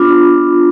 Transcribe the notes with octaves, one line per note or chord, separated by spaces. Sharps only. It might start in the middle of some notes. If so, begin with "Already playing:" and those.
Already playing: B3 D4 F4